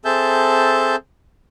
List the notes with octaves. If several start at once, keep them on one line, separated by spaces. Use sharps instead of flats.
C4 G#4 A4 E5 A5 G6